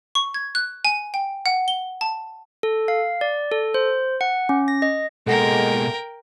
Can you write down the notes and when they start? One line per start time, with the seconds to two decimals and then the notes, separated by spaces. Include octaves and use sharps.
0.15 C#6
0.34 G#6
0.55 F#6
0.85 G#5
1.14 G5
1.46 F#5
1.68 G7
2.01 A5
2.63 A4
2.88 F5
3.21 D5
3.52 A4
3.74 C5
4.21 F#5
4.49 C#4
4.68 A#6
4.82 D#5
5.27 B2 G#3 A#3 A4 A#4 F#5 G5 A#6